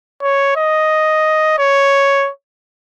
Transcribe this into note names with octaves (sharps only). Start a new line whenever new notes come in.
C#5
D#5
C#5